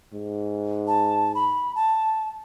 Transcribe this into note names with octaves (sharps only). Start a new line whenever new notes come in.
G#2
A5
B5
A5